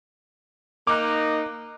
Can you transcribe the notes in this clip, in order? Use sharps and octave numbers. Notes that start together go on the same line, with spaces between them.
A#3 D#4 D6 F#6